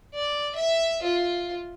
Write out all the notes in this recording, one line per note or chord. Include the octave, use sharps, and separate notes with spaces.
D5
E5
F4